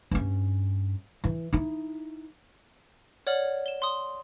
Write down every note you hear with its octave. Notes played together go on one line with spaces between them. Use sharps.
G2 C#4
E3
D#4 E4
C#5 D5 F#5 F6 F#7
E7 G7
C6 D#6